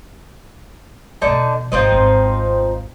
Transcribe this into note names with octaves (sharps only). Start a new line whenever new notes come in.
E2 B2 D3 D#4 A5
G#1 F3 C4 D#4
G#1 E2